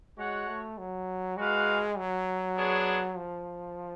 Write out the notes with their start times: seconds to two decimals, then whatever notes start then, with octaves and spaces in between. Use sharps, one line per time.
0.18 G#3 F#4 C#5 F#5
0.48 A3
0.78 F#3
1.37 G#3 F#4 B4 F5
1.98 F#3
2.57 B3 D4 G#4 C#5
3.17 F3